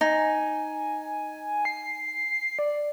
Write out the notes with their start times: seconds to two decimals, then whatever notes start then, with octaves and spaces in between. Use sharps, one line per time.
0.01 D#4 G#5
1.65 C7
2.59 D5